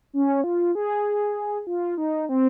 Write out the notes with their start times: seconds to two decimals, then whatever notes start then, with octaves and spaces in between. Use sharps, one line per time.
0.13 C#4
0.44 F4
0.75 G#4
1.67 F4
1.98 D#4
2.29 C4